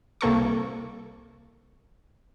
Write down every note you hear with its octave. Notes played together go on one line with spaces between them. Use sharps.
C2 A#3 A4 C#6